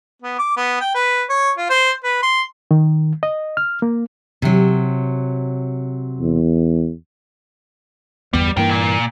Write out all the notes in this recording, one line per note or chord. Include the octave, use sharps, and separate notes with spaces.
B3
D6
B3
G5
B4
C#5
F4
C5
B4
C6
D#3
D#5
F6
A#3
C3 F#3
E2
G1 E2 G3 B3
G2 E3 A#3 A#4 G5
A#2